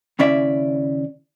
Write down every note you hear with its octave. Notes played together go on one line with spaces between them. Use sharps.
D#2 C#3 C#4 E4 D5 E5